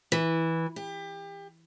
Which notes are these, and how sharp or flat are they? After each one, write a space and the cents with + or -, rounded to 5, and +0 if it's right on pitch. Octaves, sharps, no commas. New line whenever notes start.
E3 -10
G4 +30